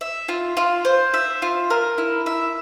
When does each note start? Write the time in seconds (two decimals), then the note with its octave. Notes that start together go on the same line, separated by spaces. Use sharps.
0.01 E5
0.28 F4
0.57 F4
0.85 C5
1.14 E5
1.42 F4
1.70 A#4
1.98 E4
2.26 E5